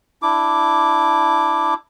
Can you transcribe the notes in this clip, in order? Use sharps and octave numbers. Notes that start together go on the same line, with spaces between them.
D4 E4 D6